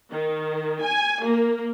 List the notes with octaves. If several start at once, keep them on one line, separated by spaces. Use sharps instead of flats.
D#3
G#5
A#3